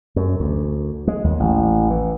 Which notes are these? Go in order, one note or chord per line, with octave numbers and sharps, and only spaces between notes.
F#2
D2
G#3
D#2
A1
E3